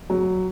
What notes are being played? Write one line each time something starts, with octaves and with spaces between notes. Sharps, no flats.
F#3